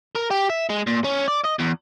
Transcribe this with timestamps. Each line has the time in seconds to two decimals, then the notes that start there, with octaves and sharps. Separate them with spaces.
0.16 A#4
0.31 G4
0.50 E5
0.69 G#3
0.87 A#2
1.04 C#4
1.28 D5
1.45 D#5
1.59 E2